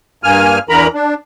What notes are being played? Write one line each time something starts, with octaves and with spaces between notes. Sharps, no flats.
G2 A#3 G#5 F6
E2 D3 E3 A#4 A#5 B5
D4